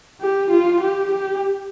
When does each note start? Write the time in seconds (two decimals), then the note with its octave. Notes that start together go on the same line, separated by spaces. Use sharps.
0.21 G4
0.51 F4
0.81 G4
1.12 G4